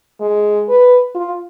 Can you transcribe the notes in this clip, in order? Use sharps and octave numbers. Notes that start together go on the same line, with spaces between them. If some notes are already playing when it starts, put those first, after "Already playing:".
G#3
B4
F4